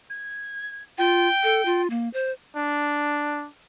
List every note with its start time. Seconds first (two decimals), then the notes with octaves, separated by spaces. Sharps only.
0.10 G#6
0.98 F4 G5
1.43 A4
1.65 F4
1.90 A#3
2.13 C5
2.56 D4